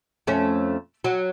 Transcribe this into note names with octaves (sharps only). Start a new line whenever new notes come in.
F2 A3 C#4
F#3